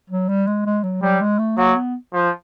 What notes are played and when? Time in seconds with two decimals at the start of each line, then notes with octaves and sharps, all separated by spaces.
0.10 F#3
0.29 G3
0.47 G#3
0.66 G#3
0.84 F#3
1.02 F#3 G3
1.21 G#3
1.39 A3
1.57 F#3 A#3
1.76 B3
2.13 F3